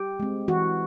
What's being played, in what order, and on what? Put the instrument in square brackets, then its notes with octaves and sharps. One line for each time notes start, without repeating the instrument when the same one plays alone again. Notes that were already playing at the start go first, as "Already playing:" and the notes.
Already playing: [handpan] G4
G#3 C4
E3 F#4